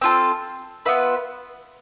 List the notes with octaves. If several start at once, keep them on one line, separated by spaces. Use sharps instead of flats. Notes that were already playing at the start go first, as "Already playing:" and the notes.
C4 F4 A4
B3 F4 B4 E5